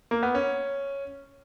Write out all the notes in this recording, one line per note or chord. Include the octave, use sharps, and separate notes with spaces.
A#3
B3
C#4